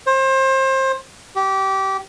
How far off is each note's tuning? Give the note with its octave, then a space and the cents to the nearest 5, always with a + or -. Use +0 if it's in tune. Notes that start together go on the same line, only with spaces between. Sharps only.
C5 +30
G4 -20